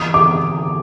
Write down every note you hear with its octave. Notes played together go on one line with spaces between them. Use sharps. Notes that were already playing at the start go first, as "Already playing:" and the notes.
Already playing: E3 D#6
D6